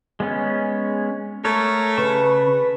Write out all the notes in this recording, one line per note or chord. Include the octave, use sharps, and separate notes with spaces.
G#3 B3 C#4
A3 A#4 C#5
C#3 B4 A5 C#6